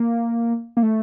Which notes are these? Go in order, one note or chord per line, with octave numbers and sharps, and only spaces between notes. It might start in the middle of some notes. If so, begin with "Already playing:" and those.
Already playing: A#3
A#3
A3